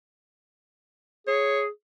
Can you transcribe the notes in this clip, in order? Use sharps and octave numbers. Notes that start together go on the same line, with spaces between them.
G#4 C#5